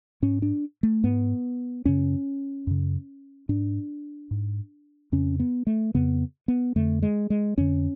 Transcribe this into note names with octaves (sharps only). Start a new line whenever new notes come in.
G#2 C#4
D4
A3
G#2 B3
F#2 C#3 C#4
F#2 C#3
G#2 D4
G#2
F2 C#3 C#4
B3
A3
F2 C#3 B3
B3
F2 D3 A3
G#3
G#3
F2 D3 C#4